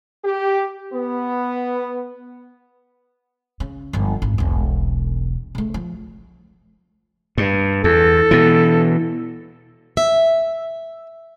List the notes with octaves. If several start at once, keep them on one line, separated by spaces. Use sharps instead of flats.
G4
B3
C#3
G1 F3
G#1
E1 B1
C#3 A3
F3
G2
E2 A4
B2 E3
E5